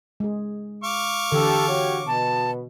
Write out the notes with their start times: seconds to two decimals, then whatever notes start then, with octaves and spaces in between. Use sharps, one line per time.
0.20 G#3 G#4
0.84 F5 C#6 D6
1.32 D3 E3 G4 A4
1.68 F#4 G4 C#5
2.07 B2 A5